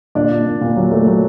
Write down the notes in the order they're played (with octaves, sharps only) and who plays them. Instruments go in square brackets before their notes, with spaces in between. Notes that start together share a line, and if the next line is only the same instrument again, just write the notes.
[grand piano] A#2 D4 D5
A#2
A#2
A#2
F#3
A3
F#3